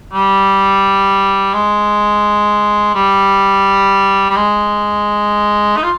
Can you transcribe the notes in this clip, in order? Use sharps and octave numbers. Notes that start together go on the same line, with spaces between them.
G3
G#3
G3
G3
G#3
D#4
F4